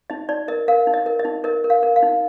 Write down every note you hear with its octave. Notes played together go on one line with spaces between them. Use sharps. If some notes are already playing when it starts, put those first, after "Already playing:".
D#4 D#5
D#4 D5
A#4 D#5
A#4 F5
D#4
D#5
A#4
D#5
D#4
A#4 D#5
A#4
F5
A#4
F5
D#4